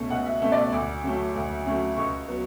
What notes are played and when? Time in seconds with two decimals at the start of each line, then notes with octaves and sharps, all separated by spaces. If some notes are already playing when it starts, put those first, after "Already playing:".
Already playing: C#2 B2 A3 C#4
0.10 C#2 F#5
0.26 E5
0.42 B2 A3 C#4 E5
0.52 D5
0.57 E5
0.72 D2 D6
1.04 C#3 F#3 A3 C#4
1.36 D2
1.66 C#3 F#3 A3 C#4
1.97 C#2 C#6
2.28 F#3 B3